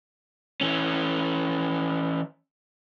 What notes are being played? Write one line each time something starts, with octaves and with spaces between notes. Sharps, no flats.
E3 C#4